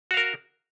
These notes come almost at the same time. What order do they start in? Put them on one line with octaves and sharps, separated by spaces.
F#4 F5 A#4